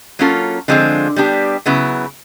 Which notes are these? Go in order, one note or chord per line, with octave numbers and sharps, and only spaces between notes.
F#3 A#3 C#4 F4 A4
D3 F3 G#3 C4 F4
G3 B3 D4 G4
C#3 F#3 B3 E4